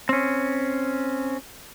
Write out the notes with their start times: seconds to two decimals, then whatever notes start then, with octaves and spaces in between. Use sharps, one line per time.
0.09 C4 C#4